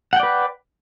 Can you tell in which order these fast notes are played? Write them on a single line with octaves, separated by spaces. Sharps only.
F#5 G5 D5 B4